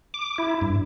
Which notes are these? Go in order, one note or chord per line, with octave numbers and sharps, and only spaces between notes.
D6
E4
G2